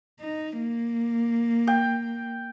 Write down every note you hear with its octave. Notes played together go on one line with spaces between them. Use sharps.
D#4
A#3
G5